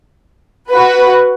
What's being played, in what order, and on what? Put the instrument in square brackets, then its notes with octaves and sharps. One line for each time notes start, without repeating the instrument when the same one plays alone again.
[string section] F#4 B4